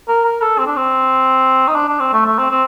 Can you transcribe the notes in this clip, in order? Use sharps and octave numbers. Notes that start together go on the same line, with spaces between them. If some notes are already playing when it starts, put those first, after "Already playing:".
A#4
A#4
A4
C4
D4
C4
D#4
D4
D4
C4
A3
A3
C4
C4